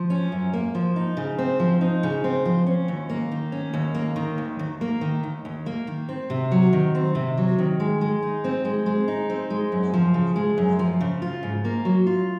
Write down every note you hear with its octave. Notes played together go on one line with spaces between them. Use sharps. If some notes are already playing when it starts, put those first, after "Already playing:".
Already playing: F3
C#4
F#2
A#3
F3
D#4
C#3
C4
F3
D#4
C#3
C4
F3
C#4
D#2
A#3
D#3
C#4
D#2
A#3
D#3
D#2
D#2
A#3
D#3
D#2
D#2
A#3
D#3
C4
C3
F#3
D#3
C4
C3
F#3
D#3
G#3
G#3
D#4
C4
G#3
G#3
D#4
C4
G#3
F#2
F3
C#3
G#3
F#2
F3
C#3
F4
G#2
A#3
F#3
F4